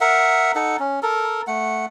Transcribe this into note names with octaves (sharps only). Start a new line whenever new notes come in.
A#4 E5 F#5
D#4 A4 F#5
C#4
A4 A#4
A3 F#5